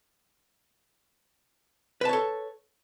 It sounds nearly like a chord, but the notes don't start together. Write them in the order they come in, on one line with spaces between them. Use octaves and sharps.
B4 A5 C#5 A4